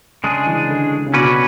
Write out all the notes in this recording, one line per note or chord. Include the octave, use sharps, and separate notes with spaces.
C#3 G#3 D4 G#4
E3
D3
C#3
B2 C#4 F#4 B4 D5